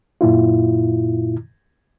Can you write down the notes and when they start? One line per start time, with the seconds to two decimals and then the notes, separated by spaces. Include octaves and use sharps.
0.21 F#2 A#2 E4 F4